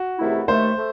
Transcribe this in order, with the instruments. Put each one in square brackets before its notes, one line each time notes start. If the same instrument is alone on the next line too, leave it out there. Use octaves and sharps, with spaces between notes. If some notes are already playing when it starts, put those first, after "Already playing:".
Already playing: [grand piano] F#4
[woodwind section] E2 C3 D#3 A3 E4
[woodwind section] D#2 D#3 A3 [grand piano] C5
[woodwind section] A3